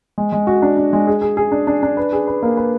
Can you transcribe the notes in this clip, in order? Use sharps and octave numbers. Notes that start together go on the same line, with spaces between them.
G#3
G#3
F#4
D4
D4
G#3
G#4
G#4
G#4
D4
D4
D4
B4
G#4
B4
A#3
B4